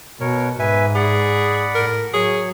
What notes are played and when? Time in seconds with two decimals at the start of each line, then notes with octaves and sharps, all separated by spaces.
0.21 B2 A#4 C#5
0.59 G#2 B4 E5 G#5
0.95 G#4 D5 F#5 B5
1.75 A2 A#4
2.13 F#3 G#4 C#5